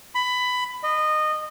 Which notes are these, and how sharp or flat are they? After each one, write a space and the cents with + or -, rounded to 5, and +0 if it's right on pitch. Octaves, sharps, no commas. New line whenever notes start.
B5 +15
D#5 -20